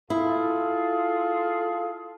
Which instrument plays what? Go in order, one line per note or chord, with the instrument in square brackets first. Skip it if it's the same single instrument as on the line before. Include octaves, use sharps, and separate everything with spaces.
[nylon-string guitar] E4 [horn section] F4 G#4 A4